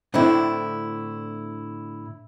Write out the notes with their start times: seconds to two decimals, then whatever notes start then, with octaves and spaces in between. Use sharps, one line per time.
0.14 A2 D3 C4 D4 E4